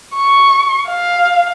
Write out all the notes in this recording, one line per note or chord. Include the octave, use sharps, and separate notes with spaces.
C#6
F5